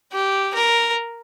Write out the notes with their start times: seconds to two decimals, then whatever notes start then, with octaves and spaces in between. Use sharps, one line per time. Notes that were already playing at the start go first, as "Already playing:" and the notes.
0.13 G4
0.54 A#4